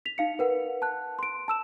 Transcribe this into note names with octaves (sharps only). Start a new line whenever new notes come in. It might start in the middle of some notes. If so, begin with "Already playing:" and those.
B6 F7
D#4 F5 C#7
A#4 B4 F#5
A5 F#6
C6 D7
A5 E6 E7